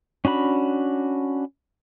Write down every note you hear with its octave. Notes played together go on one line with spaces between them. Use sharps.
C#4 D4 F#4 B5